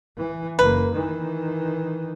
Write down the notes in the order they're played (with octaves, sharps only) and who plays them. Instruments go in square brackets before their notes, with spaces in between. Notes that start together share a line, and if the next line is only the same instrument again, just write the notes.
[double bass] E3
[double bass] F#1 A#3 [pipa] B4
[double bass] D#3 E3